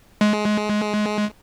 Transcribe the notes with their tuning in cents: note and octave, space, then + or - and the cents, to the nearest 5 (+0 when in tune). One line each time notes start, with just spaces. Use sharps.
G#3 +20